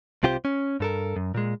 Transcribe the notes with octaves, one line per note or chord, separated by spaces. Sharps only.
C2 C3 F4 G4 C5
C#4
G2 A4 A#4
F#2
A#2 G#3